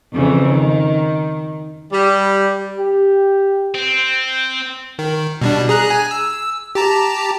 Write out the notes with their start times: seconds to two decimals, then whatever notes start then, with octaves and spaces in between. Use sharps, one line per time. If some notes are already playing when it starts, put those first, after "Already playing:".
0.13 F2 C#3 E3
0.50 D#3
1.93 G3
2.76 G4
3.75 C4
4.99 D#3
5.41 B2 G3 D4
5.69 G#4 A#5 F#6
5.90 G#5
6.11 E6
6.75 G4 A5 A#5